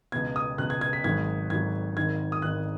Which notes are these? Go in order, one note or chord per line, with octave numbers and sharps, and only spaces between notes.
C#2 B2 B3 G#6
D#6
C#2 B2 B3 F#6
G#6
G#6
B6
G#1 G#2 F#3 G#6
G#1 G#2 F#3 G#6
G#1 G#2 D#3 G#6
D#6
G#1 G#2 D#3 F#6